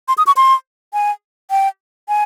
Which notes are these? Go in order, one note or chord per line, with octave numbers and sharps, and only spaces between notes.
C6
D#6
C#6
C6
G#5
G5
G#5